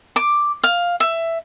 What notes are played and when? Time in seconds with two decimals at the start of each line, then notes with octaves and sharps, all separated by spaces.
0.16 D6
0.63 F5
1.00 E5